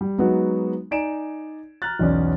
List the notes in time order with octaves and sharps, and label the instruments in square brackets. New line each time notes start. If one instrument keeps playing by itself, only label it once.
[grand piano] G3
F#3 G#3 B3 D#4 F#4
D#4 D5 G#5 A#5 D7 E7
A#5 F6 F#6 A6
B1 E2 C#4 D5